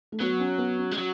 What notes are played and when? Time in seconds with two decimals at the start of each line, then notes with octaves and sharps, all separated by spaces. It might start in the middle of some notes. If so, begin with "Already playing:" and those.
0.12 A3
0.20 F#3 B3
0.40 C#4
0.58 B3
0.78 C#4
0.91 G#3
0.98 F#3